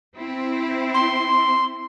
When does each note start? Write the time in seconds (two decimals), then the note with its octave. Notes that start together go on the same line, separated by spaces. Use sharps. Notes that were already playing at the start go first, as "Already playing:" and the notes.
0.16 C4 E4
0.94 C6